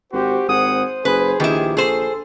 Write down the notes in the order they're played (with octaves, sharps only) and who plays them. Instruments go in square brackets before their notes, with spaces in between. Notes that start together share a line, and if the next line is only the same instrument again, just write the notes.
[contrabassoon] G#1 [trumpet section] F#4 G4 [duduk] C5
[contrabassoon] G#1 [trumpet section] G#4 F#5 D#6
[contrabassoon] F#1 [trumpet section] G#4 [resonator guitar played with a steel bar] B4
[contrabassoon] A#1 [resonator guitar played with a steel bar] D#3 E4 [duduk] G4
[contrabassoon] A#1 [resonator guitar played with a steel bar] G#4 C5 [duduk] A4